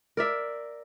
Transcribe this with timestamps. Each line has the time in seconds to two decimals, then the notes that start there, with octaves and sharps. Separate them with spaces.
0.17 A#4 D5 E5